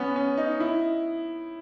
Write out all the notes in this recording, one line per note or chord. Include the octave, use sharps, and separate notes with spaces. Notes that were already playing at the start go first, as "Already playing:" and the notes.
Already playing: B3 C#4
C#4
D#4
E4